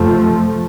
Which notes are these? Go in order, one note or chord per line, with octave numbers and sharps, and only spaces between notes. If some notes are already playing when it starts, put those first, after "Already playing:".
Already playing: F2 C3 F3 A3